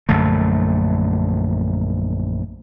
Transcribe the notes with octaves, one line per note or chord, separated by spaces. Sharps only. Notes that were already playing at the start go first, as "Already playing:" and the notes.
A#1 F#2 D3 A3